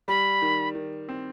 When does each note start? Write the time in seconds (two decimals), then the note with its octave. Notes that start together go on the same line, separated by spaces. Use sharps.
0.08 G3 B5
0.42 D#3
0.75 D#3
1.09 C4